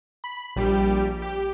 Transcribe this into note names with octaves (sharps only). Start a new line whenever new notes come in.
B5
A#1 G3 G4
G4